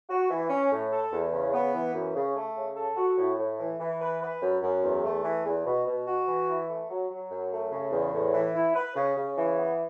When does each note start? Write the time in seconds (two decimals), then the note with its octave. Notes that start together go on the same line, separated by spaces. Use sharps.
0.09 F#4
0.30 E3
0.50 C#4
0.71 A2
0.91 A4
1.12 E2
1.32 C#3
1.53 B3
1.73 E3
1.94 F#2
2.15 C#3
2.35 A3
2.57 C#3
2.77 A4
2.97 F#4
3.18 A2
3.38 A2
3.59 E3
3.80 E3
4.01 B4
4.21 B4
4.42 F#2
4.62 F#2
4.83 E2
5.04 A3
5.24 E3
5.45 E2
5.65 B2
5.87 B2
6.06 F#4
6.27 E3
6.49 E4
6.68 A3
6.89 F#3
7.10 F#3
7.31 F#2
7.51 A3
7.71 C#3
7.92 E2
8.13 A2
8.33 E3
8.54 E4
8.75 B4
8.95 C#3
9.17 C#3
9.37 E3
9.57 B3